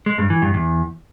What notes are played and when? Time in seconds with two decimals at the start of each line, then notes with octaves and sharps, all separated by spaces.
0.06 G#3
0.18 G2
0.30 E3
0.42 G2
0.54 E2